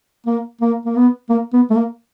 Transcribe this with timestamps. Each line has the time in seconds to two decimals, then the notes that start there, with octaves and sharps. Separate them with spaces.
0.27 A#3
0.61 A#3
0.85 A#3
0.96 B3
1.30 A#3
1.53 B3
1.70 A3
1.76 A#3